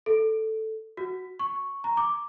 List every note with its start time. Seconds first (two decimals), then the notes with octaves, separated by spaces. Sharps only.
0.06 A4
0.97 F#4
1.39 C#6
1.84 A#5
1.97 D6